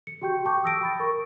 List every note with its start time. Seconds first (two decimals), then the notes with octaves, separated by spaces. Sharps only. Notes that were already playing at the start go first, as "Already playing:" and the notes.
0.07 C#7
0.22 F#4 G4 G5 C#6 G6
0.45 G5 A5 C#6 D6 G6
0.63 D#6 E6 A#6 D7
0.81 G5 B5 A6
1.00 A#4 C#6